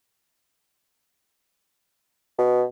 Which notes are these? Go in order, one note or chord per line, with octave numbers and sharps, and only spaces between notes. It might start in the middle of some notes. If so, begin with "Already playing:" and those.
B2